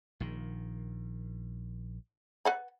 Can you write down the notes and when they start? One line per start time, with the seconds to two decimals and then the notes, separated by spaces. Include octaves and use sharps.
0.20 A#1 D#3
2.45 B4 F#5 B5